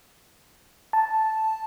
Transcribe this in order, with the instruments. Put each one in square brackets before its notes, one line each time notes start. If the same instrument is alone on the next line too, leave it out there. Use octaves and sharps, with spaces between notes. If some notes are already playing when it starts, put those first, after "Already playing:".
[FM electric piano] A5